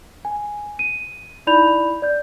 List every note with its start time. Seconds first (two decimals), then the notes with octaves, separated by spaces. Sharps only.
0.25 G#5
0.79 D#7
1.47 D#4 E4 D5 B5 G6 F7
2.02 D5 G6